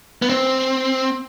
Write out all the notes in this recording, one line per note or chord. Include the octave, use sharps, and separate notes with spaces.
B3
C4